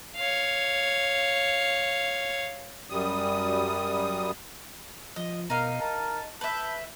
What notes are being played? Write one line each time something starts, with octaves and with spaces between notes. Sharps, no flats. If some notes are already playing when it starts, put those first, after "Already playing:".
C#5 F5
F#2 G3 D#6
F3 D#5
B2 D#4 A#4 F5
A#4 A5
B4 E5 A5 G6